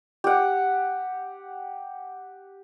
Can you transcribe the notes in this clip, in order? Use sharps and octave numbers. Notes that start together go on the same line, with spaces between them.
G4 F#5